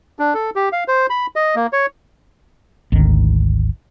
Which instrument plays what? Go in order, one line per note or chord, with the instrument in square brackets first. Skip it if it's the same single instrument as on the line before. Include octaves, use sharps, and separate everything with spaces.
[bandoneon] D4
A4
G4
F5
C5
B5
D#5
A#3
C#5
[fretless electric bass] G#1 D2 D#3